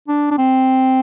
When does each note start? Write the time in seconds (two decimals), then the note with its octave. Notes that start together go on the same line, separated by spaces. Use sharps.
0.08 D4
0.31 D4
0.38 C4